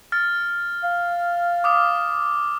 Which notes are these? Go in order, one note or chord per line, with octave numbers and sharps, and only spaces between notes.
F6 A6
F5
D6 D#6 F6